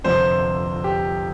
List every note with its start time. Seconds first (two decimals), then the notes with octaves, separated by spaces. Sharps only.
0.04 G1 F2 C3 C5
0.84 G4